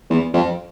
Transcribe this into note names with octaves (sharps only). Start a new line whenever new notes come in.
E2
F2